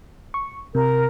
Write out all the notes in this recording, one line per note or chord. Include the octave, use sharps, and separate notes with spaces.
C#6
C3 A#4